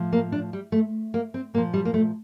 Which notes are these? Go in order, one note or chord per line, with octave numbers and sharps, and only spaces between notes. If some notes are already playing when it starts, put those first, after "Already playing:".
Already playing: A2 F3
A#3
D4
G3
A3
A#3
C4
A#2 F3 A#3
G3
A#3
A3